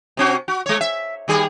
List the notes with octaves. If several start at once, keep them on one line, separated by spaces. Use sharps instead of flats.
C3 C4 F#4
F#4
G#3 C#5
E5
D#2 G3 G#4